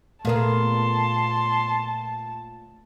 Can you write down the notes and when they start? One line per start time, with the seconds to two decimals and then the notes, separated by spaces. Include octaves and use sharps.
0.25 A#2 A3 B3 G#4 A#4 A5 C6